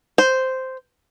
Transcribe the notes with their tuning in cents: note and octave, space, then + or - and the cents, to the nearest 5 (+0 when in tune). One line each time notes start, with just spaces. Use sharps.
C5 -5